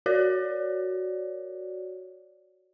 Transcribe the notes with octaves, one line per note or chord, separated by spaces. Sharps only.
F#4 A#4 C#5 D5